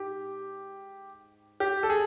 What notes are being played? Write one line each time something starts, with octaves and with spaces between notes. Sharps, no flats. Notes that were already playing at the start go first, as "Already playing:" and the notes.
Already playing: G#2 G4
G4
A4
G#4